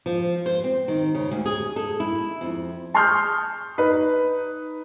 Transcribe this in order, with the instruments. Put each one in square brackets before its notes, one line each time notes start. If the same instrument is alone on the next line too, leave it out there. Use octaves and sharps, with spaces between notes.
[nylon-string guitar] F3
C5
C4
D#3
C#3
D2
G#4
A4
E4
F2
[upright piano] A5 C6 C#6 D#6 F6 G6
D#4 B4